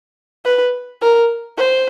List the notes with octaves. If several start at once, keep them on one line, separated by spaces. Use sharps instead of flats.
B4
A#4
C5